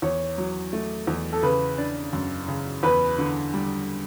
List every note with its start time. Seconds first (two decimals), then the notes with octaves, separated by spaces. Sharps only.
0.02 E2 C#5
0.38 F#3
0.73 A3
1.07 E2
1.33 A4
1.43 C#3 B4
1.78 D4
2.13 F#2
2.48 C#3
2.83 E2 B4
3.18 D3
3.54 G3